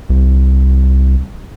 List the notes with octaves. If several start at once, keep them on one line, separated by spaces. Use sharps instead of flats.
C2